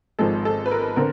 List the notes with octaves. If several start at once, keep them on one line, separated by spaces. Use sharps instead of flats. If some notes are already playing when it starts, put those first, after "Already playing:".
G#1 G#2 F3 G#3 A4
A4
B4
A#4
D3 C4 A#4